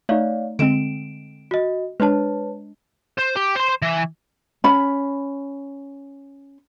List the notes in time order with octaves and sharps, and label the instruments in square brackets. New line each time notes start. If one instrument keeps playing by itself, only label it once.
[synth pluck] A3 D#4 [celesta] C#5 D5 F5
[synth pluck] D3 G#3 C4 [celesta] D7 E7
[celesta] F#4 D#5
[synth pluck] G#3 D4 [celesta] B4 C#5 A5
[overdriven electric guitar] C5
G4
C5 C6
E3
[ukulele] C#4 B5